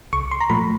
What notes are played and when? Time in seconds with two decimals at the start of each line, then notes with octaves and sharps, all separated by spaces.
0.13 C2 C#6
0.31 C6
0.41 A#5
0.50 A#2 F3 A3 B5